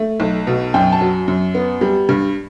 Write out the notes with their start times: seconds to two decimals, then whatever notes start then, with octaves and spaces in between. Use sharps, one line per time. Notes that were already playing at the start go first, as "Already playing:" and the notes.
Already playing: A3
0.20 B1
0.47 B2
0.74 F#2 G5
0.92 A5
1.01 F#3
1.28 F#2
1.55 B3
1.81 G3
2.09 G2